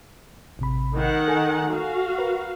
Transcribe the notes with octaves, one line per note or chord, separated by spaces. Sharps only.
A1 C3 B5
D#3 F#5
A4 G#5
F#4 F5
A#4 B4